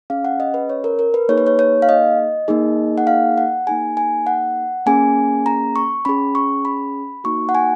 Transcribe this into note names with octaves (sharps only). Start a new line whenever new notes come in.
C#4 G#4 F5
F#5
D#5
B4
C#5
A#4
A#4
B4
A#3 D#4 G#4 C#5
B4
C#5
C#5
F5
D#5
A#3 D#4 G#4
F#5
F5
F#5
A#3 D#4 G#4 G#5
G#5
F#5
A#3 C#4 G#4 G#5
A#5
C#6
C#4 G#4 B5
C#6
B5
A#3 D#4 F#4 C#6
F#5
G#5